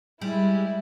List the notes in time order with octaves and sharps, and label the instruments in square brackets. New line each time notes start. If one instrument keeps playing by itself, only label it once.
[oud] G3 [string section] G#3 E4